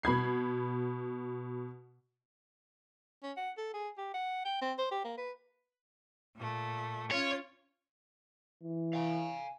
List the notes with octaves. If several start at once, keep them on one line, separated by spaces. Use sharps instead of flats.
B2 B5 G#6 C7
C#4
F#5
A4
G#4
G4
F#5
G5
C4
C5
G4
A#3
B4
A#2 A3
C#4 F4 C#5
E3
F5 G#5